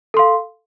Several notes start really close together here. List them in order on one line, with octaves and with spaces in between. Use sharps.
A4 C6 F5